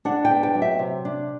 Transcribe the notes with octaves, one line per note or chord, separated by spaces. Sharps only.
D4 F#5
G5
B3
G5
F#3
E5
C3
D4